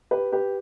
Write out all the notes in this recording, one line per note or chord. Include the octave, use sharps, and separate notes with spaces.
G4 B4
G4 B4